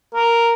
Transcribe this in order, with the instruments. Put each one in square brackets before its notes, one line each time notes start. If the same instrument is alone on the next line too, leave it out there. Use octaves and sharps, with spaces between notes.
[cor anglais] A#4